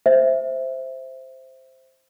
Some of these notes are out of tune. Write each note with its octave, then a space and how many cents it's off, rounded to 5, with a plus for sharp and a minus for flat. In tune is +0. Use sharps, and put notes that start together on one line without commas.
C5 +0 E5 +0